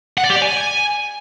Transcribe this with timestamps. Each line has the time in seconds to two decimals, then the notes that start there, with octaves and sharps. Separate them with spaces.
0.18 F#5
0.24 D5
0.30 G4
0.36 D5
0.42 G#5